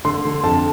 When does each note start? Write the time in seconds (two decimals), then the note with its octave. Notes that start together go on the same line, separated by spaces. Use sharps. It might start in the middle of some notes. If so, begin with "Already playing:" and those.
0.05 D3 C6
0.25 D3
0.43 F2 A5